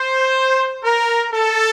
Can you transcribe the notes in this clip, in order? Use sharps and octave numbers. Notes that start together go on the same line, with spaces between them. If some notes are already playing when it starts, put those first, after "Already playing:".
Already playing: C5
A#4
A4